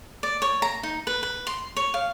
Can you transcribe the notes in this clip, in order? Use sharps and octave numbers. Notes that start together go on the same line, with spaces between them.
D5
C#5
A#5
D#4
B4
B4
C6
C#5
F5